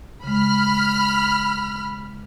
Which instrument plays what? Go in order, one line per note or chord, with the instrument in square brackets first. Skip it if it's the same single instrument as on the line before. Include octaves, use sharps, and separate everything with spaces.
[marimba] C#3 G#3 [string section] B5 F6